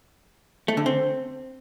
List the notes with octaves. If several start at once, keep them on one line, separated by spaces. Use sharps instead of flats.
A3
D3
C4